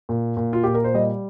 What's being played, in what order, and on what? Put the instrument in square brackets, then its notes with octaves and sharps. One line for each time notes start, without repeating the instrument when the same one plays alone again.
[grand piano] A#2
A#2
F4
A#2 G4
A#4
C5
G3 D#5